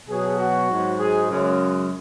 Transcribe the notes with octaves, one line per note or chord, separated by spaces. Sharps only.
B2 F#3 G#4
F#4
G#2 F#3
G#4
F#2 C#3 G#3